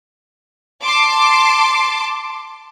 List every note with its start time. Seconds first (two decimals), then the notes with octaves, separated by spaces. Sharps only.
0.85 A5 C6 D6